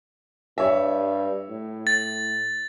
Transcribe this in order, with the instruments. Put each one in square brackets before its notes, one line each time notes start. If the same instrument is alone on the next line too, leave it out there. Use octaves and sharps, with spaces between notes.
[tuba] G2 [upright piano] C#5 E5
[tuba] A2
[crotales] A6